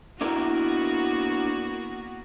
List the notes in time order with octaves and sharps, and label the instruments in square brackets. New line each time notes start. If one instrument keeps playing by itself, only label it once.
[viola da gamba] A#3 B3 F#4 [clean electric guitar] D4 E4 A#4